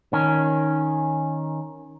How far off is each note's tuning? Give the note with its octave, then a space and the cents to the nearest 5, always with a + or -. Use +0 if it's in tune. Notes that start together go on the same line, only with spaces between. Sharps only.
D#3 +0 C#4 +0